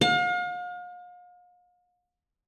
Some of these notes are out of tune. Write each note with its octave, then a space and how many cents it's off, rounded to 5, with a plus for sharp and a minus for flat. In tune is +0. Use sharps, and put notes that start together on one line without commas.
F5 +40